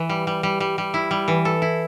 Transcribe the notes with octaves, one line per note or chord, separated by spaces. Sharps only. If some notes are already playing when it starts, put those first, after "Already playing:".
Already playing: E3
G3
G3
G3
G3
G3
E4
G3
E3
A4
E4